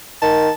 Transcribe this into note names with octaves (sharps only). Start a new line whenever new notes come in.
D#3 A5